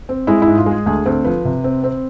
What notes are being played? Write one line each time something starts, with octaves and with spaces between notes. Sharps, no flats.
C4
G#3 E4
E4
G#2
F4
G#3 G#4
D2 G#4
D2 C4
F3 B4
C3
C4
C4